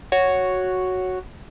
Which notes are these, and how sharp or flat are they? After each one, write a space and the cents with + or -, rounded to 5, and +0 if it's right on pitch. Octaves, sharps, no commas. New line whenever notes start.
F#4 +0 C#5 +0